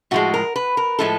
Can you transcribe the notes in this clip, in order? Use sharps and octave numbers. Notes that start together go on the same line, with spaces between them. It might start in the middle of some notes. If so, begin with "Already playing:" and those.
A2 F3 G#3 F#4
A#4
B4
A#4
A2 F3 G#3 A4